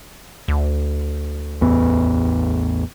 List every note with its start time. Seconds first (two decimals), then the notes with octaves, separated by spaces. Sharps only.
0.48 D2
1.61 A1 E2 B3